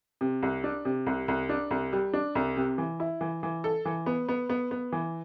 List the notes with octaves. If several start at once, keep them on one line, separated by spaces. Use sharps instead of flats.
C3
C2
D4
C3
C2
C2
D4
C2
G3
D4
C2
C3
E3
E4
E3
E3
A4
E3
B3
B3
B3
B3
E3